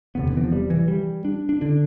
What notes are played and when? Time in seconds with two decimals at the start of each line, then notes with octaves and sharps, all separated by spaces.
0.15 E1 D2 C3 B3
0.29 D3
0.37 E3
0.44 F3
0.52 G3
0.70 E3
0.88 G3
1.25 D4
1.49 D4
1.61 D3 D4